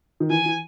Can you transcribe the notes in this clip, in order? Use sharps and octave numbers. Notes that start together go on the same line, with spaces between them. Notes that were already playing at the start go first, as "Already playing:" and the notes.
D#3
E3 G#5
E3